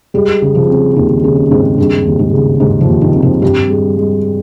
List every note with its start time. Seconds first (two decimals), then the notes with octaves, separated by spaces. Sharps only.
0.14 G3 G#3
0.42 C#3
0.55 F3
0.68 C4
0.96 D#2 D#3
1.24 C#3 G#3
1.51 G#2 C4
1.78 G2 G#3
2.05 D#2
2.19 G#2
2.33 C#3
2.60 D#2 G#2
2.81 F3
2.88 D#2
3.01 D#3
3.15 C4
3.22 F3
3.42 G2 G3
3.70 G#3
3.97 G#3